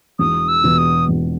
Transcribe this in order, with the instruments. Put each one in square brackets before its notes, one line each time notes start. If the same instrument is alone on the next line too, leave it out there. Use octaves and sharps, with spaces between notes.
[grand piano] E1 [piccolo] D#6
[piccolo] E6
[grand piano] E2 B2
[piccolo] D#6
[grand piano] E1